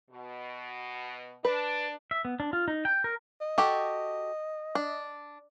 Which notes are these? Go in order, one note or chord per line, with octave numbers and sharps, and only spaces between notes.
B2
D4 B4
E5
B3
D4
F4
D#4
G5
A#4
D#5
F#4 G4 A4
D4